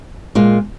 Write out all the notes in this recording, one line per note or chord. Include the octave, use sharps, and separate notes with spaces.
A#2 G#3 F4